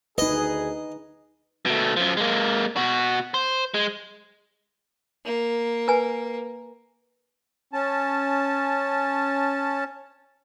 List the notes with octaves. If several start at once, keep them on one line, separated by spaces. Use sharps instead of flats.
D2 D#4 G#4 B4 D#5
B2 A3
F#2 F3
G#3 A#3
B2 F#4
C5
G#3
A#3
B4 G#5
C#4 A5